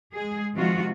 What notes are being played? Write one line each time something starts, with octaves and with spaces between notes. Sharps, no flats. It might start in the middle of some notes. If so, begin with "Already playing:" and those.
G#3 G#4
C3 D#3 F3 G#3 F4 F#4